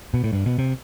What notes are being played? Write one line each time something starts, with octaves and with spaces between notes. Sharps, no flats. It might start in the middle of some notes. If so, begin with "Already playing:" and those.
B2
A2
G2
B2
C3